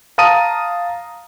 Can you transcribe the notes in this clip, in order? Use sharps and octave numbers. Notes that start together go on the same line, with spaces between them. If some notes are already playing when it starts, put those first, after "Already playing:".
F5 A5 A#5 D#6 D#7